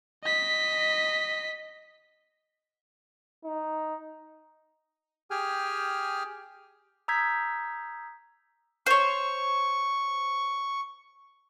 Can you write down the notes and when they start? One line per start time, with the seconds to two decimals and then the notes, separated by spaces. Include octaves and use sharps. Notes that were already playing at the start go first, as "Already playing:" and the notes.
0.23 D#5 B6
3.45 D#4
5.31 G4 G#4 G5 G#5 F6
7.08 A#5 D#6 E6 G6 G#6 B6
8.86 C5 C#5 C#6